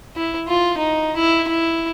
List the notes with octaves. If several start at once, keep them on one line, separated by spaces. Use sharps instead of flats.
E4
F4
D#4
E4
E4